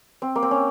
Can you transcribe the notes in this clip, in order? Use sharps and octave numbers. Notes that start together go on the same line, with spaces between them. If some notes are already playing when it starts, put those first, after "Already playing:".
C4
A#3
C4
C#4